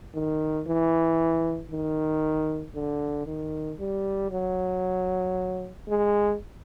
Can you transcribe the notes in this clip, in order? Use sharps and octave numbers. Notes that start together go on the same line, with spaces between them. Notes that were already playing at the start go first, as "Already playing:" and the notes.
D#3
E3
D#3
D3
D#3
G3
F#3
G#3